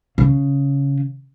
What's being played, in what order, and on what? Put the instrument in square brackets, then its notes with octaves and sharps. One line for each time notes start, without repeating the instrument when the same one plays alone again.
[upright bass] C#3